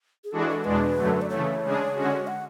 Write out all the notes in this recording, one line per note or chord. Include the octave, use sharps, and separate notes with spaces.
G#4
E3 G#3 D4 F#4 A4
A4
E2 B2 G#3 D4 B4
F#2 D3 F#3 A3
D5
C#3 E3 A3 C#5
C#3 G#3 D4 G#4
D3 G#3 C#4 F#4
F#5